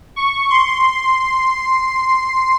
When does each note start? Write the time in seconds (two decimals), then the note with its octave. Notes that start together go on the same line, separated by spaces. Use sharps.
0.16 C#6
0.50 C6